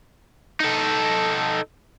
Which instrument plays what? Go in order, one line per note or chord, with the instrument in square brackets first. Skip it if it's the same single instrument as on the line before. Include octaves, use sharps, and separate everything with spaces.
[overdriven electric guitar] D#4 A4